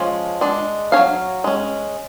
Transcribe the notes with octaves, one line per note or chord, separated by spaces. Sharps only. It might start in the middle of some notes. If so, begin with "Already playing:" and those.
Already playing: F3 G#3 C#4
G#3 D4
F#3 C#4 C#5 F5
G#3 C#4